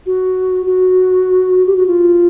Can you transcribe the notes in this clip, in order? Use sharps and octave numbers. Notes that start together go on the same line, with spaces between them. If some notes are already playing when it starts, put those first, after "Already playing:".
F#4
F#4
G4
F#4
F4